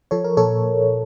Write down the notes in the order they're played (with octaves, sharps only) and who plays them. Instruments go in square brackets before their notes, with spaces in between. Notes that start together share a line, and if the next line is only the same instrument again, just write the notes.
[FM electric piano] F3 A4 C#5
A#4
A#2 A4 C#5